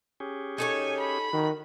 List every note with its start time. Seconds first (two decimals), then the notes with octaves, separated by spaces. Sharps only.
0.20 C#4 G4 G#4
0.58 D#4 A4 C#5 G#5
1.00 B5
1.33 D#3 F#4